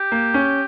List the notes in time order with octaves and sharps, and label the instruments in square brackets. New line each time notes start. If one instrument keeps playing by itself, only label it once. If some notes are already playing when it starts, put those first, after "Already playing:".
Already playing: [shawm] G4
[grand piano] A#3
C#4